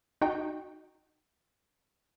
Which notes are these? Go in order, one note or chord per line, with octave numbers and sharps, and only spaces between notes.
D#4 F#4 G5